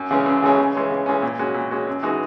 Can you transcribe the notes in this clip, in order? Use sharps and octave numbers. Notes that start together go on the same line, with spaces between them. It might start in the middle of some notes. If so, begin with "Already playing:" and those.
Already playing: F#2
C#3 E3 G#3 C#4
F#2
C#3 E3 G#3 C#4
C#3
E3 G#3 C#4
C#3
E3 G#3 C#4
A#2
G#3 C#4 F#4
A#2
G#3 C#4 F#4
F#2
E3 G#3 D#4 F#4